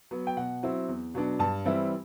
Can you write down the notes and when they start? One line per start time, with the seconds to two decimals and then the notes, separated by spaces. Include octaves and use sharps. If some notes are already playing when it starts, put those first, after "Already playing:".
0.11 F#3 B3
0.27 G5
0.37 B2 F#5
0.63 F#3 C4 E4
0.88 E2
1.14 B2 F#3 B3 D4
1.39 G2 A5
1.65 E3 G3 C4 E4